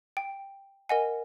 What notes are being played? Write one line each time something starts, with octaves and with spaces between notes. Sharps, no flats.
G5
A#4 D#5 F#5 G#5